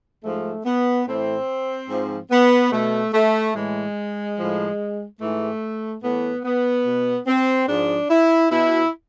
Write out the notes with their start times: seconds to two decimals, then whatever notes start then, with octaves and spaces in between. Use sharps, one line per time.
0.24 G#2 F3 A3
0.66 B3
1.07 A2 E3 C4
1.89 G#2 F3
2.31 B3
2.72 B2 A3
3.13 A3
3.55 A2 E3 G#3
4.38 A2 F3
5.20 G#2 E3 A3
6.03 A2 E3 B3
6.44 B3
6.86 B2
7.27 C4
7.68 G#2 F3 D4
8.10 E4
8.51 B2 E4